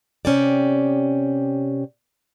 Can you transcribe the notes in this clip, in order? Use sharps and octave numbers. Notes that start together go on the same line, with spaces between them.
C3 C#4 G4 D5